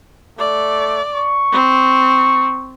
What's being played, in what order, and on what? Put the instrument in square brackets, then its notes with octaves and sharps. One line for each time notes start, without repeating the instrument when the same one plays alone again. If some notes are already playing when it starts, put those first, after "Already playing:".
[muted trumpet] A3 [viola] D5
[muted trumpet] C#6
[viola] C4